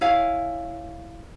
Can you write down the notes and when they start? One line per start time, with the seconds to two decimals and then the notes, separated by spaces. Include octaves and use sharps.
0.01 E4 C#5 F5 G#5